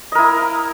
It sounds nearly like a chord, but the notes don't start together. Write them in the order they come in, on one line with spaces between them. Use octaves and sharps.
D#5 A#4 E4